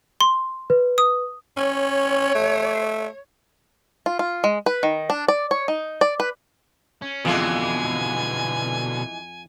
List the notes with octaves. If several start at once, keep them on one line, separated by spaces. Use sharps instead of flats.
C6
B4
D#6
C#4 C#5
A3
F4
F4
G#3
B4
D#3
D4
D5
C#5
D#4
D5
B4
C#4
F2 B2 D3 E3 G#3 F4 G#5